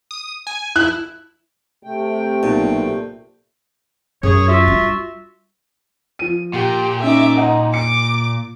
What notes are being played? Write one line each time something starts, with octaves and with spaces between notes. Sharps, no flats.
D#6
G#5
E4 F#6
C3 A3 G5
B1 A#2
F#2 G#4 C#5
F4 F#4 E5
G3 D4
F3 D#7
A#2 G4
C#4 D#4 E5 D6
D#4 D#5 F#5
D6 C#7